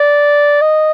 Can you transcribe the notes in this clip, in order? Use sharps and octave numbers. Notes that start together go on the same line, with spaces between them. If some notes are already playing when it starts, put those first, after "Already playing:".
Already playing: D5
D#5